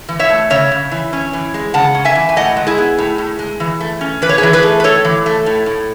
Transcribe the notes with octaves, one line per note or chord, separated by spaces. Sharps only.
E3
C#5 E5
A3
C#3 C#5 E5
C#3
E3
C#4
E3
G#3
C#3 F#5 A5
C#4
E5 G#5
E3
G#5
A2 D#5 F#5
G#3
E4 G#4
B3
A2
A2
G#3
E3
A3
C#4
E3 B4
C#5
G#4 B4
E3
G#4 B4
A3
B4
A2 A4 C#5
E3
A3
A2
A2